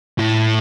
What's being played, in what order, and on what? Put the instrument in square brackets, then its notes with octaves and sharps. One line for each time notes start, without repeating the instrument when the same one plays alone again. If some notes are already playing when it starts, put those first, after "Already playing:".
[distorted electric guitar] A2